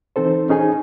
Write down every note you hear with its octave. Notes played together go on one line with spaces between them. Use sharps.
E3 C4 D#4 A4 C5
C#4 D#4 G#4 G#5